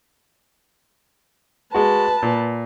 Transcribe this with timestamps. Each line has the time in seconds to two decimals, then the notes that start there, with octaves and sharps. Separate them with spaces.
1.74 G#3 F#4 B4 A5
2.23 A#2